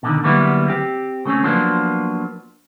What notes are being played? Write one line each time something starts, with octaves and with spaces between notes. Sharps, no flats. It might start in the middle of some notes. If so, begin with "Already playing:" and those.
B2 D3 D#3
D3 F#3 G3 A#3 B3 E4
C4 G4
C#3 A3 C4 C#4
F3 F#3 A#3 B3 D4 C5